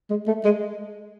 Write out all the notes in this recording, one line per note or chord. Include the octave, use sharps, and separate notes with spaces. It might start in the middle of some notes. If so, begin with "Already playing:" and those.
G#3
A3
G#3